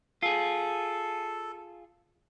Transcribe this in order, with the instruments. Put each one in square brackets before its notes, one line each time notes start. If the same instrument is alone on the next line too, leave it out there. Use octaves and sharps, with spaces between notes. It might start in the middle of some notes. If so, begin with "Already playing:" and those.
[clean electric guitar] F4 G#4 [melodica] A4